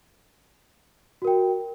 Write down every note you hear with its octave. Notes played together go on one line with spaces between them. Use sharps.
F#4 A#4 G5